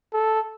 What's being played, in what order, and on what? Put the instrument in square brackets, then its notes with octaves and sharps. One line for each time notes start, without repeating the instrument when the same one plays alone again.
[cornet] A4